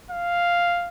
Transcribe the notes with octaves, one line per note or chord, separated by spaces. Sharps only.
F5